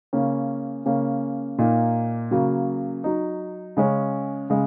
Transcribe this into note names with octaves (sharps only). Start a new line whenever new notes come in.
C#3 A#3 C#4
C#3 A#3 C#4
A#2 A#3 D#4
C#3 F#3 A#3
F#3 D#4
C#3 G#3 C#4
C#3 G#3